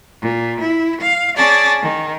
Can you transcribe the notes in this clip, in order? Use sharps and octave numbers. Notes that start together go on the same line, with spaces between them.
A#2
E4
F5
C#4 G#4 D5 A5
D#3